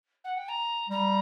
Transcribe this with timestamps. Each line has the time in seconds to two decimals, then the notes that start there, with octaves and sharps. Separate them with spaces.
0.24 F#5
0.36 G5
0.48 A#5
0.89 G3 A#5